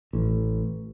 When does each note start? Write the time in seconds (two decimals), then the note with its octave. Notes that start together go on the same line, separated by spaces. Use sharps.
0.13 A1